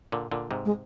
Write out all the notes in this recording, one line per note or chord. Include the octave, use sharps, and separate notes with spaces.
A#2 D3
A#2 D3
G#2 C3
G#3